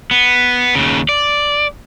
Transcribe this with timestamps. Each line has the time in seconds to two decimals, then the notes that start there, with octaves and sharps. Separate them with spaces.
0.11 B3
0.75 D#2 C#3
1.09 D5